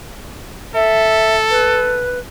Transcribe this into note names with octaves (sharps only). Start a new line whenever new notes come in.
A4 E5
B4